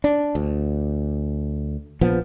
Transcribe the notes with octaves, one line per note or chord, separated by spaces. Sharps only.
D4
D2
A#1 F3 B3